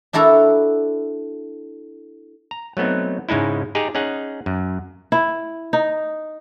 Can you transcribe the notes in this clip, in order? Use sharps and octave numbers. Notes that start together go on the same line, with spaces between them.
D4 E4 F#4 A4 A#5
A#5
F#3 A3 B3 C4 D#4
G#2 C#3 G#3 D#4 E4
D#4 G4 G#4 A#5
C#4 D#4 G#4 F#5
F#2
E4
D#4